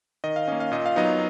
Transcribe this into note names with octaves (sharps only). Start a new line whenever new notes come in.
D#3 D#5
F5
A#3 C#4 D#5
F5
A#2 D#5
F5
F#3 B3 D#4 D#5